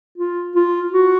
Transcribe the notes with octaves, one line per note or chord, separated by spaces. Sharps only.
F4
F4
F#4